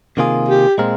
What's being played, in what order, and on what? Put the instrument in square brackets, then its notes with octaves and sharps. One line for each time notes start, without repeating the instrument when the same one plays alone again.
[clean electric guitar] C3 D#3 A#3 F4 G#4
[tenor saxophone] G4
[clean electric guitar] A#2 G#3 C4 F4 A#4